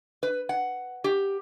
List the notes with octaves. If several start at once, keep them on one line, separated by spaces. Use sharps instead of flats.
B4
F#5
G4